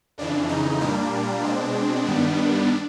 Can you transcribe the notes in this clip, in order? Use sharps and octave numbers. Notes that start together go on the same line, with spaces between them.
F2 C#3 E3 D4
D#4
A#2 G3 A#3 D4
B2 G#3 C4
G2 D#3 G3 B3